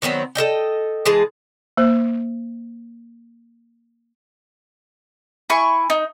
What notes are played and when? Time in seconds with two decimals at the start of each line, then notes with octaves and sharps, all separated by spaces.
0.02 D#3 F#3 B3 C4
0.35 A4 A#4 D#5 G5
1.06 E3 G#3 G#4 A5
1.77 A#3 C5
5.50 E4 G#5 C#6
5.90 D#4